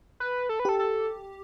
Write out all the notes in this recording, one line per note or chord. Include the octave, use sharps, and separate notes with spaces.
B4
A4
B4
G4 A4
A4